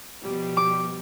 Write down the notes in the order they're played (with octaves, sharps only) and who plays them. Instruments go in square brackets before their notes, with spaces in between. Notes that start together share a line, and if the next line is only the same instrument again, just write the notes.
[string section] B2 F3 G3
[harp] D6